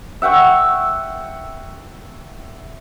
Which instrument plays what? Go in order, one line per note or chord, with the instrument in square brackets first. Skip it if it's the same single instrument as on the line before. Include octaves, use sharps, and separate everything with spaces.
[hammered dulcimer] E5 F#5 G5 C#6